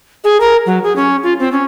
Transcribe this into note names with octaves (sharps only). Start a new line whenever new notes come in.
G#4
A#4
F#3
G#4
C#4
F4
C4
C#4